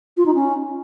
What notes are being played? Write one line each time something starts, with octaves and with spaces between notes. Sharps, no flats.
F4
D#4
C#4